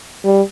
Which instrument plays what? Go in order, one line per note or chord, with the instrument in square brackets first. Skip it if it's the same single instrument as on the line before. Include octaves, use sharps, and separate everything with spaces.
[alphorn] G3